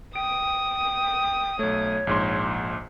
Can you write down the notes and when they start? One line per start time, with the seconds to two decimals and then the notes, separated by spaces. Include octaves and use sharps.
0.16 G5 D#6 D7
1.59 B1 A3 C#5
2.07 A#1 G#2 C6